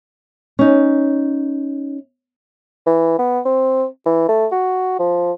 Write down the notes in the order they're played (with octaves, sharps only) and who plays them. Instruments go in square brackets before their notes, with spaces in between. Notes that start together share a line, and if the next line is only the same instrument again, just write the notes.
[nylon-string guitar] C#4 D#4
[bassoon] E3
B3
C4
E3
A3
F#4
F3